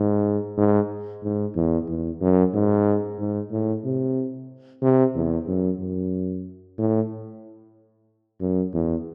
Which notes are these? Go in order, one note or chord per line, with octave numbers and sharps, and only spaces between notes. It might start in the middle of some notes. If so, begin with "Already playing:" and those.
Already playing: G#2
G#2
G#2
E2
E2
F#2
G#2
G#2
A2
C3
C3
E2
F#2
F#2
A2
F#2
E2